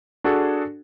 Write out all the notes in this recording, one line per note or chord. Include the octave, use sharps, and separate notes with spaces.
D4 F#4 G#4 A4